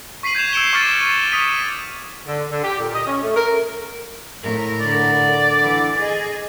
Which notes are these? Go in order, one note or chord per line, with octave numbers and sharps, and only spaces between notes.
C#6 B6 C7 D#7 F#7
G6 G#6 C7 E7 F7
E6 G#6 C#7 D7 E7 G7
C#6 D6 F6 A6 C7
D#7
D#6 B6 D#7
D3
D3
G4
A#2
D#5
C#4
A3
A#4
A2 A#4
D3 D5
E3
G#4 D#5